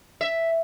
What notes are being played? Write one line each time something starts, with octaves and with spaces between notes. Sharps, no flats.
E5